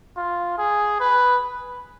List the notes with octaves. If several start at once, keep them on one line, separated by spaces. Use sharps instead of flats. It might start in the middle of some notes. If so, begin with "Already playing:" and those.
F4
G#4
B4